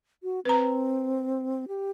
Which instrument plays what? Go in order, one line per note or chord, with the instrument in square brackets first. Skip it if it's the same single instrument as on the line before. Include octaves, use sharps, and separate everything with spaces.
[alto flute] F#4
[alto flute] C4 [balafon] B4 A#5
[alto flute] G4